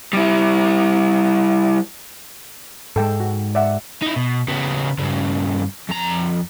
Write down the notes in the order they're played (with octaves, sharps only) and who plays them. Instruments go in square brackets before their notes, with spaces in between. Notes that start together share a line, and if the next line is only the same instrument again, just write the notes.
[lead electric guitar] G3 E4
[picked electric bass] G#2 G#3 [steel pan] A4 G5 A5
[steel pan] F#4
D5 E5 F#5
[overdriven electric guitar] D#4 E4
B2
C#3 B3
G2 C#3
F2 A#5